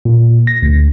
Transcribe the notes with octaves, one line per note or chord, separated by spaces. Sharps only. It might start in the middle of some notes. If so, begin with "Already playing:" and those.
A#2
A#6
D2